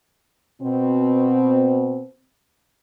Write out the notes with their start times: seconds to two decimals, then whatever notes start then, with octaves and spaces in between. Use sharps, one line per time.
0.62 B2 C4